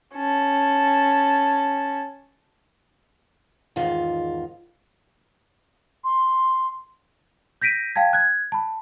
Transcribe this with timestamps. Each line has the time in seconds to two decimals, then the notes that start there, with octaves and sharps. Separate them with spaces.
0.15 C#4 A5
3.76 E2 G#2 D#3 F4
6.04 C6
7.62 G6 A#6 B6 D7 D#7
7.95 F5 G5 A5 G#6
8.13 F#6 G#6
8.52 A5 B5